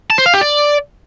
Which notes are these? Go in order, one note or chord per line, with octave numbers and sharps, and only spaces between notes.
A5
C5
F5
G4
D5